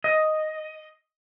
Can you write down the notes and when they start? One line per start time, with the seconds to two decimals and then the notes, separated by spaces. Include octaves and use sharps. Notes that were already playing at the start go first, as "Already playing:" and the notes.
0.04 D#5